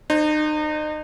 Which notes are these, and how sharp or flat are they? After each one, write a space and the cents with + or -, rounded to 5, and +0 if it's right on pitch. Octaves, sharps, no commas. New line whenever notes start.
D#4 -35 C5 +15